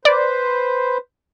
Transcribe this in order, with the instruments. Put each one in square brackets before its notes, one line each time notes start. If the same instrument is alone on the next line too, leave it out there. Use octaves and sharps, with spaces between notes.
[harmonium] B4 C5 [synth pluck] D5